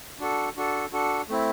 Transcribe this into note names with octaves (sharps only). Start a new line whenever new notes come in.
D4 F#4 A4
D4 F#4 A4
D4 F#4 A4
A3 C4 E4